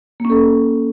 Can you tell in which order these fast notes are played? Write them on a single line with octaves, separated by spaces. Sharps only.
A#3 C#4 A4